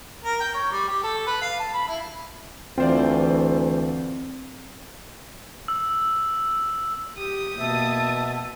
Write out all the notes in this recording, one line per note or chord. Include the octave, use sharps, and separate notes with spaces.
A#4
G5
C#5
G3
G4
A4
B4
F5
A5
B5
E4
D2 E3 C4 F4 C5 D5
E6
G4 D#6
B2 A#3 E5 A5